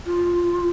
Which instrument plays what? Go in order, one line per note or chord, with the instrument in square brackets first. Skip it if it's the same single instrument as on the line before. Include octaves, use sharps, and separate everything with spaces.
[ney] F4